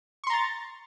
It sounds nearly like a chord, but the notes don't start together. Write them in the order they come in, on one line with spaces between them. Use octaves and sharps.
C#6 C6 A#5 A6